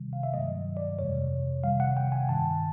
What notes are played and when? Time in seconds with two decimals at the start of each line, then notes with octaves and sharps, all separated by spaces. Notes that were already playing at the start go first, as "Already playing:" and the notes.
Already playing: C3 D#3 G3
0.13 F5
0.23 E5
0.34 G2 D#3 F#3 A3 D#5
0.77 D5
0.98 F2 C3 E3 G3 C#5
1.64 C3 D#3 G3 F5
1.80 F#5
1.97 G5
2.12 G#5
2.28 G2 D#3 G3 A5